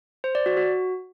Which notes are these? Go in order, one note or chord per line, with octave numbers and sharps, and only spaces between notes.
C5
D5
F#4
F#4